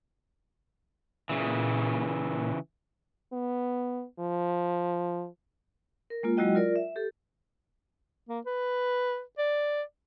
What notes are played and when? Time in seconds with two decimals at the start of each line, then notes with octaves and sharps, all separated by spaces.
1.29 A#2 C#3 E3
3.33 B3
4.19 F3
6.10 A#4
6.23 G#3 A#3 F4
6.37 F#3 G#3 E4 F#4 D#5 G5
6.55 F4 A#4 D5
6.76 E5
6.96 G4 A4
8.29 A#3
8.46 B4
9.38 D5